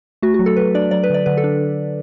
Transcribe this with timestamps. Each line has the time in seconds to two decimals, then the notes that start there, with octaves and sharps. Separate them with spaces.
0.22 A3 F#4
0.34 F#3 F#4
0.46 A4
0.57 F#3 B4
0.75 D4 D5
0.91 F#3 D5
1.03 B4
1.10 D3 D5
1.26 D3 B4
1.37 A4
1.44 D4